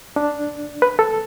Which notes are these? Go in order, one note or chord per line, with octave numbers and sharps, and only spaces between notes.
D4
B4
A4